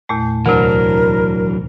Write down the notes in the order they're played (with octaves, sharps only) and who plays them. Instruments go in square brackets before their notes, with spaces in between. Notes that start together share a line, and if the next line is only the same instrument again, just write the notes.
[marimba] E2 A#2 A3
[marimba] D2 C3 [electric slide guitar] E3 F#3 D4 [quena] A#4